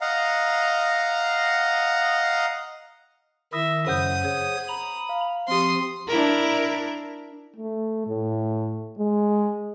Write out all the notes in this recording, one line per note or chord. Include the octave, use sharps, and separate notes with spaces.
D#5 F5 F#5 A#5
D#3 E4 E5 D#6 E6 A#6
F#2 C#3 F#3 C5 F#5 D#6 G6
G#4 C#5
A#5 B5
F5
F3 C4 G4 C6 D#6
D4 E4 A#4
A3
A2
G#3